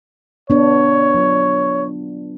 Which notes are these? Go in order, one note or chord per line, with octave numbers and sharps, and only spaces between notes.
B3 D4 C#5
F#3 F4